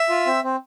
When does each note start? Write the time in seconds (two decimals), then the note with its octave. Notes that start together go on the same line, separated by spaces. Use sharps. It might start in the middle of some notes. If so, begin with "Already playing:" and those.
Already playing: E5 E6
0.09 F4
0.26 C4
0.44 C4